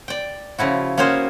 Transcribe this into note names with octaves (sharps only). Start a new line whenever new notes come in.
D5 G5
C#3 F3 E4 F#4
A#3 C#4 F#4 G#4 C5